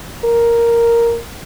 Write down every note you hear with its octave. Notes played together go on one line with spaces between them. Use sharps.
A#4